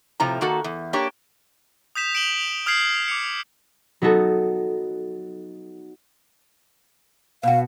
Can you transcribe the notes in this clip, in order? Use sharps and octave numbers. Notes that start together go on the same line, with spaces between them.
A2 C3 F3 A#5
D#3 A#3 F#4 A4
E2
A#3 D4 G4 C#5
D#6 G6 B6 E7 F7
D7 E7 F#7 G7
D#6 F6 G6 G#6 C7 F#7
D6 C#7
F#3 B3 D#4 F#4 A4
B2 F#4 F5